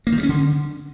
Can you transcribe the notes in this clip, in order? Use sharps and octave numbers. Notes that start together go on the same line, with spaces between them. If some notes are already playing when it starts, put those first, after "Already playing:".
A#3
D#3
G3
C#4
D3